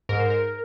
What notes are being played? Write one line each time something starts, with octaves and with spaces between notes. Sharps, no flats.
G#2 A#4
C5
A#4